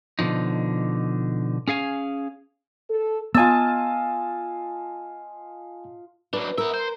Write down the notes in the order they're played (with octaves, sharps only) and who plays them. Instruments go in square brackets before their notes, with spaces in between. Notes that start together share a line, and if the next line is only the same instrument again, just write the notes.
[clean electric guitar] B2 D3 F3 D#4
C#4 G#4 F5 G#5
[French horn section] A4
[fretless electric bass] B3 [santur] F4 D#5 A5 [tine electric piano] G#5 E6
[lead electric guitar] F#3 D4 [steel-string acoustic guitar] B4
[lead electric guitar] B3 E5 [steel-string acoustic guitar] A#4
[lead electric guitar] C5